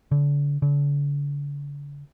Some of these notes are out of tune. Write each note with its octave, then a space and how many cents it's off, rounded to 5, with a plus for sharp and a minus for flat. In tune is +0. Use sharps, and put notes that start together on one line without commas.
D3 -35
D3 -45